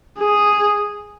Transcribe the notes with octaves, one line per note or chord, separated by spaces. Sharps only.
G#4